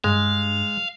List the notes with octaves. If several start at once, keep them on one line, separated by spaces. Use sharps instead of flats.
G2 G#3 F5